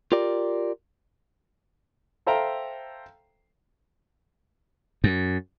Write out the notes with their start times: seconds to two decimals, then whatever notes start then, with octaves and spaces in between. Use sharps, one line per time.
0.12 F4 G4 A#4 D5
2.27 A4 C5 E5 F5 G5 A#5
5.04 F#2